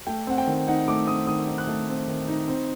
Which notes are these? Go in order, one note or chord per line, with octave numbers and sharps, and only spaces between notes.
A3 G5
C4 F#5
G5
D#3
D#4 F#5
A3 D6
C4 D#6
D#3 D#6
D#4
F#6
A3
C4
D#3
D#4
C4